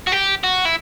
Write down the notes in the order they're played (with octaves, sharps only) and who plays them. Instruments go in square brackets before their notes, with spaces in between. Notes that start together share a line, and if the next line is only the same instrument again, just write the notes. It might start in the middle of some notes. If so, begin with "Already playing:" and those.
[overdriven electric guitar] F#4
G4
F#4
E4